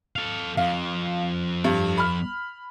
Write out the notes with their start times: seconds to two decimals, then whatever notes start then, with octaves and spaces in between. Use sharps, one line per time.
0.16 A4 F5
0.57 F2 F5
1.64 G2
1.98 B5 F6